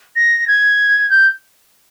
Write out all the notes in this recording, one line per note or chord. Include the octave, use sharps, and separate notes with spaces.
A#6
G#6
G6